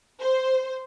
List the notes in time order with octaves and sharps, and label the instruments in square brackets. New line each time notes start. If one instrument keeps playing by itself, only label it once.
[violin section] C5